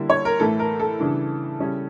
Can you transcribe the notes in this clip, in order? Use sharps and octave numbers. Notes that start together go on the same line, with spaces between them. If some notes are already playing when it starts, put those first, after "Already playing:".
Already playing: D3 G3 A#3 E4
C#5
A#4
A2 E3 A3 E4 A4
A#4
A4
C#3 E3 G3 D4
C#3 G3 C#4 E4